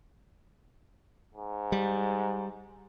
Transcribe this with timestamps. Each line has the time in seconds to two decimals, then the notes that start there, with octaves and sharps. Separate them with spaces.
1.35 G#2
1.72 G3